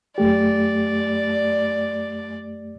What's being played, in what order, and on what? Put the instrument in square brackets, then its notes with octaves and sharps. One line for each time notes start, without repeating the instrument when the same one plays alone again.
[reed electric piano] F#2 A3 G4 [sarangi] D5